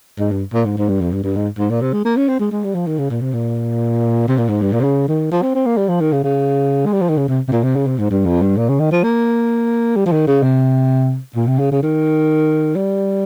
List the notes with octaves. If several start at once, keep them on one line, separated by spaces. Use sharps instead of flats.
G#2
G2
A#2
G#2
G#2
G2
F2
G2
G2
G#2
G#2
A#2
C3
G#3
A#3
C#4
C4
G#3
G#3
G3
F3
D#3
C#3
A#2
C3
A#2
C3
A#2
G#2
G2
A#2
C3
C#3
D#3
F3
C4
C4
A#3
G3
F3
D#3
C#3
C#3
G#3
G3
F3
D#3
C#3
C3
C3
A#2
C3
C#3
C3
G#2
G2
F2
G2
A#2
C#3
D#3
F3
A#3
G3
F3
D#3
C#3
C3
A#2
C3
C#3
C#3
D#3
G3